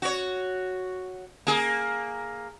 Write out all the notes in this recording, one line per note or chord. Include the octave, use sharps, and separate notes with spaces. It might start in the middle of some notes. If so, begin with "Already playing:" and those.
F#4 C#5
A#3 G#4